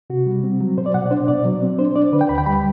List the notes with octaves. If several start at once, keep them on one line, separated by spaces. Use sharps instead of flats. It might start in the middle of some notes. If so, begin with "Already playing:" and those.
C3 F#4
G3
C4
F#3
B2 C5
D5
B2 F#5
D5
D4 C5
B2 D5
F#3
C4
D4 C5
D4 D5
D3 B4
G5
D2 B5
G5
G3 B5